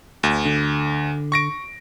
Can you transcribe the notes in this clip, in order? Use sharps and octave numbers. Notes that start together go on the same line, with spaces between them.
D2
D3
C#6 A#6 D7